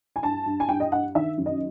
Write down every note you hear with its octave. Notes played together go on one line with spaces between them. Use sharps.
G#5
G2 A5
G2
G#5
G2 G5
D#5
G2 F#5
D#3 E5
F#2
D#5